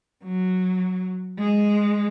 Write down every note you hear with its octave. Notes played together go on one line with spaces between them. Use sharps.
F#3
G#3